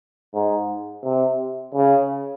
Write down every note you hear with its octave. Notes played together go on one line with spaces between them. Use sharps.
G#2
C3
C#3